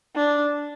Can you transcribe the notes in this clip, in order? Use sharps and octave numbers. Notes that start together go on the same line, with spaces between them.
D4